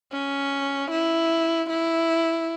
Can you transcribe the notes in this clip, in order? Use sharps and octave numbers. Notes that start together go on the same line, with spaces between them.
C#4
E4
E4